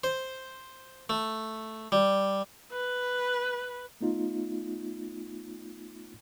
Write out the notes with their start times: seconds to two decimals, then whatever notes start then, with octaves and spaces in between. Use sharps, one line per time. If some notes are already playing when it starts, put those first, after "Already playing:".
0.04 C5
1.10 A3
1.92 G3
2.72 B4
4.01 A3 B3 D#4 F4